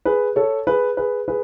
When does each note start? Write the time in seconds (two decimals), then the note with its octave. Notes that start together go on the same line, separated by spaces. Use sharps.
0.05 G#4 B4
0.36 A4 C#5
0.67 G#4 B4
0.97 G#4 B4
1.28 G#4 B4